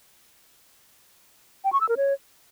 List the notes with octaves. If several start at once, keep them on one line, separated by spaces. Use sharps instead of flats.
G5
C#6
E6
A#4
C#5